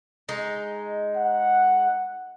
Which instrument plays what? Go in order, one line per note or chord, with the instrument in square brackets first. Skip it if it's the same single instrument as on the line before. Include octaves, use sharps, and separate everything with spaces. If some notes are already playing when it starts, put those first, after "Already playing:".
[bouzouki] G#3 D#4
[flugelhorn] F#5